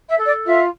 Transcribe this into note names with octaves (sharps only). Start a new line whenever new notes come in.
E5
A4
D5
F4 E5